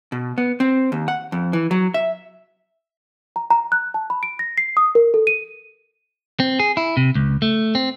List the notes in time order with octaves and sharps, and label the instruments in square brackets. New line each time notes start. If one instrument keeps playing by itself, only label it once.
[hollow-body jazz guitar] B2
B3
C4
D#2
F#5
F2
E3
F#3
E5
[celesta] A#5
A#5
F#6
A5
B5
D7
A#6
C7
D#6
A#4
A4
D#7
[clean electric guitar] C4
G#4
E4
C3
C#2
A3
C4